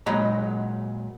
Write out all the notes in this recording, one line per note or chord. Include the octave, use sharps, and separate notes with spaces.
A#2 F#3 G#3 D#5 A#5 B5